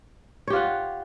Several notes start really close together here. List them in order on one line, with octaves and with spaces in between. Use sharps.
C#5 G4 F4 F#5